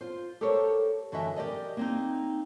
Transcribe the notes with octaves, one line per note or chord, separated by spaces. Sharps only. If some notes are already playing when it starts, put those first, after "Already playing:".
F4 C5
G4 A4 A#4 C5 C#5
F#2 D3 E3 F#4 D#5 E5
G4 A#4 D5 D#5
A#3 C4 D#4